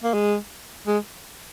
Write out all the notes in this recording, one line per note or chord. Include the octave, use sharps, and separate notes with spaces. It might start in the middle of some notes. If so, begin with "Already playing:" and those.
A#3
G#3
G#3